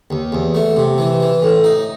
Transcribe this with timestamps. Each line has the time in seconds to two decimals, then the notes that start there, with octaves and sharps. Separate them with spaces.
0.10 D#2
0.32 E2
0.54 A3
0.76 C3
0.98 E3
1.20 E3
1.42 A2
1.64 D#4